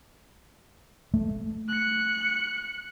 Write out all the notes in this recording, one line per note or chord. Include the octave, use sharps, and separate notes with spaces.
A3
F#6 C#7